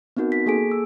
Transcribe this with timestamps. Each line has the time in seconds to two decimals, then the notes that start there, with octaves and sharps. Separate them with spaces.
0.17 B3 C4 D#4 F#4 A#4
0.32 B6
0.46 A#3 G#4 A4 G#5 D7
0.72 E6